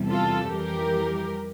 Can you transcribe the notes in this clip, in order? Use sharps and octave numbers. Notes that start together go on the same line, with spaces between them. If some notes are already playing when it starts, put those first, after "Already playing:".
Already playing: E2 C3 G3
F4 A4
F2 E3 G3 G4 A#4